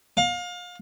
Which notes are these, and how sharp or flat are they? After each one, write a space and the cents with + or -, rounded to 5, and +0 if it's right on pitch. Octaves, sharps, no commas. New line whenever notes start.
F5 +30